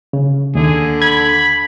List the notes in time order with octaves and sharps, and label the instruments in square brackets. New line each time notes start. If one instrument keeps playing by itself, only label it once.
[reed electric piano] C#3
[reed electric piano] D#2 [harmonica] D3 [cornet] G#4
[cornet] B5 [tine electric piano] G#6